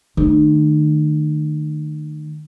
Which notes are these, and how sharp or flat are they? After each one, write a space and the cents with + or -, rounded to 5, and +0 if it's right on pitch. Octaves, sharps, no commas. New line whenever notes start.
D#3 -40 A3 +0